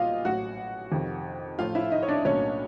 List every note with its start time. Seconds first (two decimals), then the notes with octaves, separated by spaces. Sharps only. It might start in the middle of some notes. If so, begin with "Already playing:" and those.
Already playing: B1 A#2 G3 C4 F4 D#5 F5
0.25 A1 A2 F#3 F#4 F#5
0.92 F2 C3 D#3
1.58 A1 A2 F3 A3 C#4 F4 F5
1.75 E4 E5
1.92 D#4 D#5
2.03 C#5
2.08 D4 D5
2.25 B1 A2 F#3 A#3 C#4 D4 C#5